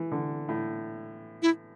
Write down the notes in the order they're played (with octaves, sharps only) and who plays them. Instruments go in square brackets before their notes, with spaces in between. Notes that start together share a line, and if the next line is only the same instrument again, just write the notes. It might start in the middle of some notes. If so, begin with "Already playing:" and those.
Already playing: [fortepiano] E3
D3
A2
[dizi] E4